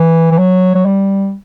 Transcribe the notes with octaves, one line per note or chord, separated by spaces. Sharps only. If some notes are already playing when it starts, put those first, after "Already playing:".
Already playing: E3
E3
F#3
F#3
G3